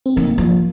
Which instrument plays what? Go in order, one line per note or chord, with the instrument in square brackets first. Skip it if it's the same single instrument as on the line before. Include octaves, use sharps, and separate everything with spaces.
[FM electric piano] C4
[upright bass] D#3 [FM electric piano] A#3
[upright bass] F3